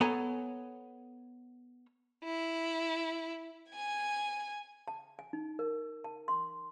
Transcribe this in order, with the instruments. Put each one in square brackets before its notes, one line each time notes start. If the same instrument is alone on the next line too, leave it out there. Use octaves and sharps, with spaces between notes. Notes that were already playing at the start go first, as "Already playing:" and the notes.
[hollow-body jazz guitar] B3 A4 C#5 G#5 A#5
[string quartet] E4
G#5 G#6
[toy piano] A5
G#5
D#4
A#4
A5
C6